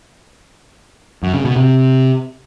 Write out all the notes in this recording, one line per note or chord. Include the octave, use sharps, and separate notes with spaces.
F#2
C#3
B2
C3